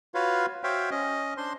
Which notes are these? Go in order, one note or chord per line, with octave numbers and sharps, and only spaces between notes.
F4 F#4 B4 C#5 F5
F#4 C5 C#5 E5 F5 G5
C#4 D#5
D4 C5 C6